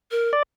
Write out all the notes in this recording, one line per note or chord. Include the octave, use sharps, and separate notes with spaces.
A#4
D5